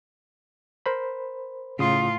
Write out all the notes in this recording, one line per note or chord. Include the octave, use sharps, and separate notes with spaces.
A#4 C5 B5
A2 C#3 F4 D#6